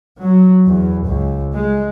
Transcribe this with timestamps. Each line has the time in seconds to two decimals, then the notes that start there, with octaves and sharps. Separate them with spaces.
0.22 F#3
0.66 E2
1.07 C#2
1.54 G#3